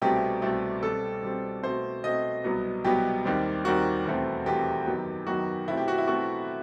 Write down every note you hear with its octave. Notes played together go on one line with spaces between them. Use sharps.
C2 B2 A3 C4 G4
C2 B2 A3 C4
B2 G3 C4 A4
B2 G3 C4
B2 A3 C4 C5
B2 A3 C4 D#5
C2 B2 F#3 B3
C2 B2 F#3 B3 G4
D#2 D#3 G3 C4
D#2 D#3 G3 C4 F#4
E2 B2 A3 C4
E2 B2 A3 C4 G4
F#2 D#3 F#3 B3
F#2 D#3 F#3 B3 F#4
B2 A3 C4 E4
G4
F#4
E4
B2 A3 C4 F#4